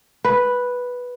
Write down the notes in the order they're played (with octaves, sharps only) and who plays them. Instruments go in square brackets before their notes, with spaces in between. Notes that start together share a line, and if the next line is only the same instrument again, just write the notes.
[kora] B4